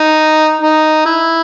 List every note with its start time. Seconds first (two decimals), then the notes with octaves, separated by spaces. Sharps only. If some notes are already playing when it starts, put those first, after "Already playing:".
Already playing: D#4
0.62 D#4
1.06 E4